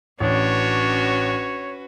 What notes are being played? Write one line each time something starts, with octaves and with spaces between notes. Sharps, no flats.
A1 C#4 D4 F#4 B4 C#5